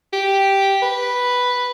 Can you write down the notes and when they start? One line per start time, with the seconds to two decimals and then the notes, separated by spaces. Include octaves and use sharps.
0.13 G4
0.82 B4